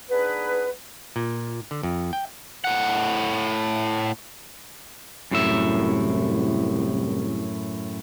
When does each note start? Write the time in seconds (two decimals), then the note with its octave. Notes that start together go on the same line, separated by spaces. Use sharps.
0.10 B3 D4 D#4 G#4 B4
1.16 A#2
1.71 D3
1.83 F2
2.13 G5
2.64 A2 F#5
5.31 C2 F#2 A2 E5